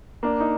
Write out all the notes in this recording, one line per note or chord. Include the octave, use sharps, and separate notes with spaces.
A#3 D4
D#4